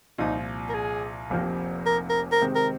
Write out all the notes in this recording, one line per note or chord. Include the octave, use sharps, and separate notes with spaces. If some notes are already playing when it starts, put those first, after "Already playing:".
C2 A#2 F3 D#4
A#4
G#4
F1 F2 C3 F3 A#3
A#4
A#4
A#4
C3 D#3 G#3 C4
A#4